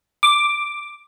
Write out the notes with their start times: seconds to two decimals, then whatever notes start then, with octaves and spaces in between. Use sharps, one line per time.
0.23 D6